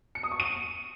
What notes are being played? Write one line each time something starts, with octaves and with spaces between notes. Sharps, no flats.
C#7
D#6
C#6
D#7